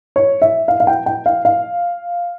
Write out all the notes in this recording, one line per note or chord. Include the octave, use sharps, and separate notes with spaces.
C#5
E5
F5
F5
G5
G5
F5
F5